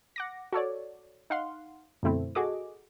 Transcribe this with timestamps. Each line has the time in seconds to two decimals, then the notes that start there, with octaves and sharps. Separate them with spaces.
0.16 F#5 D6 A#6
0.52 F#4 A4 C#5 D5
1.30 D#4 F5 F#5 C6
2.03 F#2 B2 D3 A3 C4 E4
2.35 F#4 G#4 A4 D#5 D6